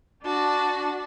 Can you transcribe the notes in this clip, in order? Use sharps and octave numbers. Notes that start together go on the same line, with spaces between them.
D4 F#4 A5